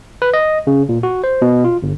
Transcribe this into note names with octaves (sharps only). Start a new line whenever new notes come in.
B4
D#5
C#3
A#2
F#4
C5
B2
F4
G1